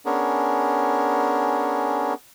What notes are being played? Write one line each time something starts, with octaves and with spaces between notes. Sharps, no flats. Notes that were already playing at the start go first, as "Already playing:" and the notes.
B3 C#4 D4 G#4 A#4